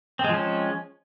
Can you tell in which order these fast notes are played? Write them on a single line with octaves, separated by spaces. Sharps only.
C4 G#3 F3 C#4